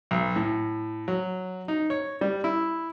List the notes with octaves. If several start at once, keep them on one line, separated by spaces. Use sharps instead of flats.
B1
A2
F#3
D#4
C#5
G3
E4